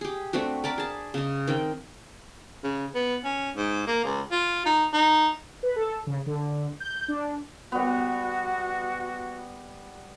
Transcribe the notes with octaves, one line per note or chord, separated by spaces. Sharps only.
G4 G#4
A3 C4 D4 F#4
A#4 D5 A5 B5
G#4 A5
C#3 D#5
D#3 C4 G5
C#3
B3
C#4
G#2
A#3
C#2
F4
D#4
D#4
B4
A4
C#3
D3
G6
D4
G3 B3 F#4